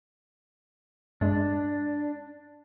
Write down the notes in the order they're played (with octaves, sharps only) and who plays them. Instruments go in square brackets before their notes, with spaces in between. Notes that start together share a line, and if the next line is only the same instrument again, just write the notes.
[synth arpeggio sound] G2 G#3 [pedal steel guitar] D4